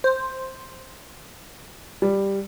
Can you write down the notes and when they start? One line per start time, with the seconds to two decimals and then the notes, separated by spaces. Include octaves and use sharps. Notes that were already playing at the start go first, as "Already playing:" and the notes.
0.04 C5
2.02 G3